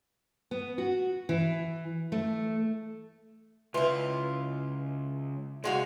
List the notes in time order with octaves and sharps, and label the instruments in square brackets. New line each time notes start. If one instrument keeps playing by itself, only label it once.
[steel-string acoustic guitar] B3
F#4
E3
A3
[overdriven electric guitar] C#2 [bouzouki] E4 F4 [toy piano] B4 E5 G#5
[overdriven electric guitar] C2 [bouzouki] G#3 F#4 F5